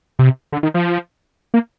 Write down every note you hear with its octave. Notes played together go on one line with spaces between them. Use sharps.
C3
D3
D#3
F3
A#3